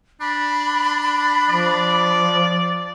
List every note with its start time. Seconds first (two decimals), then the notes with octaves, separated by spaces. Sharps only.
0.21 D4 B5
1.50 F3 D5